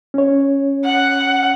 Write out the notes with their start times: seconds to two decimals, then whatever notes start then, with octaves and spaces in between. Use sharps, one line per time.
0.14 C#4 C#5
0.85 F#5